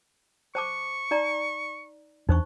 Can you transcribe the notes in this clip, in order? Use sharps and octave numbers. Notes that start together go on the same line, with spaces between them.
C5 A5 C#6 D6
D#4 D5 A#5
E2 D4 D#4 C5 C#6